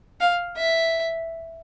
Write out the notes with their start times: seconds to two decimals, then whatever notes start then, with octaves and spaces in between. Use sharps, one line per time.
0.20 F5
0.57 E5